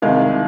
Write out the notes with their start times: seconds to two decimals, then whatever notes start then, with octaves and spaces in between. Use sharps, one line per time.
0.02 C2 C3 D#3 G#3 F5
0.21 F5